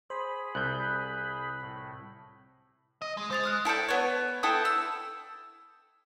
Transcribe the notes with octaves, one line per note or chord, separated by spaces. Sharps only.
G#4 C5 B5
C2 F#6 G6
A2
D#5
G#3
G#3 C5 A6 F7
D#6 F6 F#6
E4 A4 D5 G5
B3 C#5
E4 A4 G5 D#6
E6